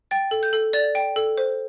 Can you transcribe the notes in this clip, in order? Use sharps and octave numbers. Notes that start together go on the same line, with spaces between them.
G5 A6
A4
G6
A4
D5 A6
G5
A4
C5